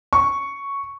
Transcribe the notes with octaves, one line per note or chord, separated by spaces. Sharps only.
C#6